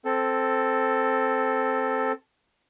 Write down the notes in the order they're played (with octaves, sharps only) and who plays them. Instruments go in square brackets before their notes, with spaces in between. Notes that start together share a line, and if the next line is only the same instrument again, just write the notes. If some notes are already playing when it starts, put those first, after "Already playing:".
[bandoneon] C4 A4